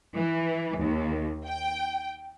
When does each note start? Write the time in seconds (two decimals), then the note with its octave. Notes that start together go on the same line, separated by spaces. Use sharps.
0.15 E3
0.78 D#2
1.46 G5